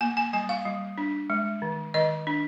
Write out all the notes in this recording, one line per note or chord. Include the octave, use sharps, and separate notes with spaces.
A#3 G#5
G#5
G3 G#5
F5
G3
D4
G#3
D#3
D#3 D#5
D4